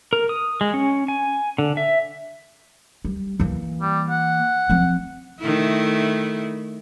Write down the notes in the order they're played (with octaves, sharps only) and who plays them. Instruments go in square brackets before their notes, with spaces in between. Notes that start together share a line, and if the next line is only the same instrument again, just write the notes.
[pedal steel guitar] A#4
D#6
G#3
C#4
G#5
D3
E5
[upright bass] G3
E3 A#3
[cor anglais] G3
F#5
[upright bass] F3 C4
[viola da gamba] D#3 A3 E4